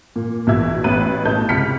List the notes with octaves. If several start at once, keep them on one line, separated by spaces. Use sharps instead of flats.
A#2
A#1 B2 E3 E5 E6 G#6
A1 B3 B4 D#7
B1 A2 C#4 D#4 A5 G6
C#2 C3 F6 B6 C#7